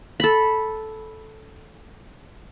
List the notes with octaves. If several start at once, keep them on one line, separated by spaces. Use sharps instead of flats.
A4 B5